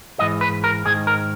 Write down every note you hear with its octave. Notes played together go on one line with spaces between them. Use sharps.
G#2 E3 D#5
B4
A#4
G#2 D#3 G#4
A#4